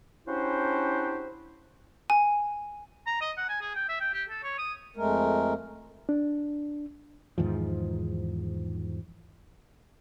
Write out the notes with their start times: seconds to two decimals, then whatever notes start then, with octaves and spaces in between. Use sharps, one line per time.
0.26 C#4 D4 E4 F#4 G4 C5
2.10 G#5
3.07 A#5
3.21 D#5
3.37 F#5
3.49 G#5
3.61 G#4
3.76 G5
3.89 E5
4.01 G5
4.14 G4
4.29 A4
4.43 C#5
4.58 D#6
4.96 F2 G#3 A3 A#4
6.09 D4
7.38 E2 G#2 D#3 F3